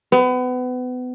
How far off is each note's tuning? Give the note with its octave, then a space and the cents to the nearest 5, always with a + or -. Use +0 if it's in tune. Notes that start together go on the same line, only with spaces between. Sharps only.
B3 +30